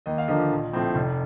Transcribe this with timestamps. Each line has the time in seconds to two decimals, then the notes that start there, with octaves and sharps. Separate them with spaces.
0.06 D#2 D#5
0.18 F5
0.28 D3 F3 A#3 D#5
0.51 A#1
0.73 A2 F3 C4
0.95 F1